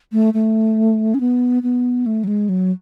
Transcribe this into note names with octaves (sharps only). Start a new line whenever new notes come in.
A3
A3
C#4
B3
B3
A3
F#3
G#3
F#3